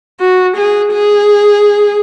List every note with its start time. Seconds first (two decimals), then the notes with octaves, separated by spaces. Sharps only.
0.20 F#4
0.56 G#4
0.93 G#4